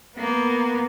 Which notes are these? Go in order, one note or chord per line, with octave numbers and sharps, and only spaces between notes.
A#3 B3